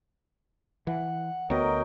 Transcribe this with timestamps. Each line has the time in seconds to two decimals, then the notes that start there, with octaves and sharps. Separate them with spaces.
0.87 E3 F#5
1.50 D2 F#3 B3 A#4 D#5 G5